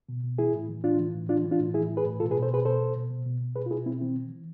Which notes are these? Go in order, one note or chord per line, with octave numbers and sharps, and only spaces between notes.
B2
B2
E3 E4 G#4
A2
E3
A2 D4 F4
E3
A2
E3 D4 F4
E3
D4 F4
A2
A2 E4 G#4
E3
G#4 B4
A2
B2 F4 A4
G#4 B4
B2
A4 C5
B2 G#4 B4
B2 A4 C5
B2
B2
B2
B2
B2
B2 G#4 B4
F4
B2 E4 G#4
B2 C4 E4
E3 C4
E3
E3